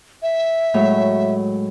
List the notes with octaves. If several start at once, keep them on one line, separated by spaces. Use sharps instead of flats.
E5
A2 F#3 G#3